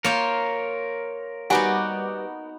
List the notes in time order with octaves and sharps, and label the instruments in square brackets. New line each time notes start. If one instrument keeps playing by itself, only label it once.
[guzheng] A#3 F4 C5 [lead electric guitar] A#4 C#5
[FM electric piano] G3 B4 D6 [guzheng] B3 D#4 F#4 [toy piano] F#5 G#5